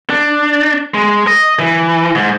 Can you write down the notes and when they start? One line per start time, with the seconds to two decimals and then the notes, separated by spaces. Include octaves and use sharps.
0.10 D4
0.94 G#3
1.27 D#5
1.60 E3
2.15 G#2